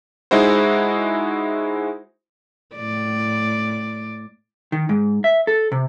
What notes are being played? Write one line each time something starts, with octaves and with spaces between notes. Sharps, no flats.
G#3 D#4 E4 F#4 C5
A2 D5
D#3
G#2
E5
A4
C3